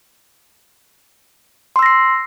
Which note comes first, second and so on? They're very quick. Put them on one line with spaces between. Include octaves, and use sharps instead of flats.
C6 E6 A#6 C7